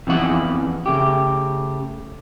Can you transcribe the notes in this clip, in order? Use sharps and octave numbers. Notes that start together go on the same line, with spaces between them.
F2 E3 B3 F#5
C#3 A3 G4